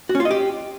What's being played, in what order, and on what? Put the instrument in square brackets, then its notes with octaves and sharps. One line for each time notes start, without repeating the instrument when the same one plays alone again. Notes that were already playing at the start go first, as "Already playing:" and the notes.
[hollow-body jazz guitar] F#4
C#4
F4
D#5
G4